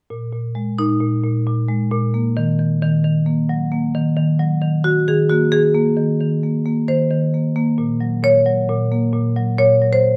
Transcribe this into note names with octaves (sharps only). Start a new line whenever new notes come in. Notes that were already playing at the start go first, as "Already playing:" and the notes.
A#2
A#2
G#3
A#2 D#4
A#2
A#2
A#2
G#3
A#2
A#3
D#3
D#3
D#3
D#3
A#3
F#3
A#3
D#3
D#3
F#3
D#3
D#3 F#4
D#3 G#4
A#3 F#4
D#3 G#4
A#3
D#3
D#3
A#3
A#3
D#3 C5
D#3
A#3
A#3
A#2
F#3
A#2 C#5
F#3
A#2
A#3
A#2
F#3
A#2 C#5
F#3
C5